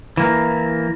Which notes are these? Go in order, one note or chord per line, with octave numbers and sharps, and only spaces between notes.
E3 A#3